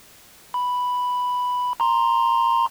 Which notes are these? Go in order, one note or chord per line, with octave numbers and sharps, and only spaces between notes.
B5
A#5 C6